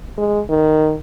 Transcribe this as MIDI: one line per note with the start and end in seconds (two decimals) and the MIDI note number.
0.18 0.41 56
0.49 0.95 51